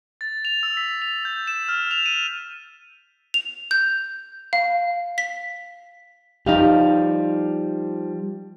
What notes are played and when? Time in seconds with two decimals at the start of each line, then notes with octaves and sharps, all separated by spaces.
0.21 A6
0.45 F7
0.63 E6
0.77 B6
1.02 F7
1.25 G6
1.47 E7
1.69 F6
1.91 F7
2.06 D#7
3.34 F7
3.71 G6
4.53 F5
5.18 B6
6.46 F3 G3 D#4 G4 F5